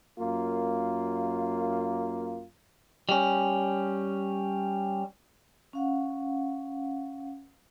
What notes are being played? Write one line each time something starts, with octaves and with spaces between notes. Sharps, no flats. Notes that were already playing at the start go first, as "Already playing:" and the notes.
F#2 A#3 F4
G3 C#4
C#4 F5 F#5